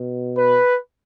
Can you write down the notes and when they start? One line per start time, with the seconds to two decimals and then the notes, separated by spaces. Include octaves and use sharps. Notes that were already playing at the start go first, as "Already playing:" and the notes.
Already playing: B2
0.37 B4